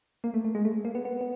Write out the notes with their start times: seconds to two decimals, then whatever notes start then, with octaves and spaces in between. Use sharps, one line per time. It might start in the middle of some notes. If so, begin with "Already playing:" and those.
0.24 A#3
0.34 A3
0.45 A3
0.55 G#3
0.65 A3
0.85 A#3
0.95 B3
1.05 B3
1.21 B3